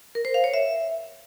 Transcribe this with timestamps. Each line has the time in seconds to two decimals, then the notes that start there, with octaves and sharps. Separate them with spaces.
0.15 A#4
0.25 C5
0.34 F5
0.44 C#5
0.54 E5